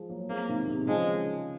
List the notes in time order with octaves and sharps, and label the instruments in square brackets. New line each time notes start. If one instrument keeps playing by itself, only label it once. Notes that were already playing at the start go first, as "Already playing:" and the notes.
Already playing: [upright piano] F3 G#3
F#3 A#3
[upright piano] G#3 C4 [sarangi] A#3
[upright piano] C3 D#3
C3 D#3
[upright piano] C#3 F3 [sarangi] G#3